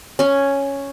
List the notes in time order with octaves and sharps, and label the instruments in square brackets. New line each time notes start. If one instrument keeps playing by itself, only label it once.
[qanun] C#4 G#5